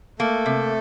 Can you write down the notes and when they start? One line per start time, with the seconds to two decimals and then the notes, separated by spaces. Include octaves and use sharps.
0.19 A3 A#3 A4
0.46 C3